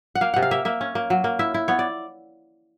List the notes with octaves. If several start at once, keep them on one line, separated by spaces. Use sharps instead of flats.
F#5
A#3 F5
C3 F#5
F5
A#3 E5
A#3 E5
C#4
A#3
F#3
A#3
E4 E5
E4
B3 C#5
D5